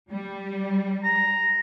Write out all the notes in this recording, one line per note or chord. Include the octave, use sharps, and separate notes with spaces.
G3
A#5